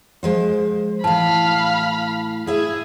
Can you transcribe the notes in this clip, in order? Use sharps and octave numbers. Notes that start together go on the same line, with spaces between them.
F3 G#3 C5
A2 E3 F5 A5 B5
E4 G#4 E5